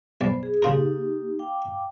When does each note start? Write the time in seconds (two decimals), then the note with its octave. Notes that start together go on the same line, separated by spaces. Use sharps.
0.21 B1 C5 D5 B5
0.43 G#4
0.62 C#3 A#3 D#4 F4 G4 A#4
1.39 F5 G5 D6